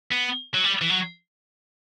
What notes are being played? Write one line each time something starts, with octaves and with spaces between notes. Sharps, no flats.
B3
F#3
G3
E3
F#3